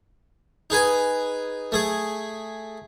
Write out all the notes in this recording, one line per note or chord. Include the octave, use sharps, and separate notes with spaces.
D#4 G#4 B4 G#5
A3 G#4